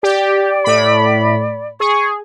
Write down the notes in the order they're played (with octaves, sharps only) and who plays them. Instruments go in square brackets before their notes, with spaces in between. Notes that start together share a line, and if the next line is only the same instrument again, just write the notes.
[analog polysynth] G4 [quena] D5
[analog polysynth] A2 B5
[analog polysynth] G#4 [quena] C#6